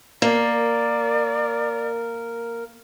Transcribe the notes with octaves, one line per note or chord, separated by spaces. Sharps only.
A#3 A#4 D5